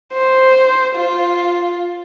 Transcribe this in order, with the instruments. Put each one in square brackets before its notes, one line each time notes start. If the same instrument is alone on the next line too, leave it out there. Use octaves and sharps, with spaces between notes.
[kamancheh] C5
F4